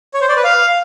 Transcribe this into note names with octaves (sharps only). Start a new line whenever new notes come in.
C#5
C5
D5
B4
F5